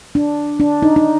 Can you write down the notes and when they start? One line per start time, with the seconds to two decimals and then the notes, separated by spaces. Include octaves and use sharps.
0.15 D4
0.60 D4
0.82 D#4
0.96 D#4